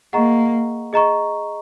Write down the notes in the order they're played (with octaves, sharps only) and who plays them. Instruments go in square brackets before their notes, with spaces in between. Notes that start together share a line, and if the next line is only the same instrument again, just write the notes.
[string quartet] A#3 [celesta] G#4 D#5 F#5 A#5 C#6
[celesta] G#4 D#5 A#5 C#6